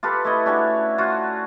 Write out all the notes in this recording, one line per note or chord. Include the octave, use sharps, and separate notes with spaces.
F4 G4 A4 B4
A3 E4 D#5
C#4 D4 F#4 C#5
F4 F#4 F#5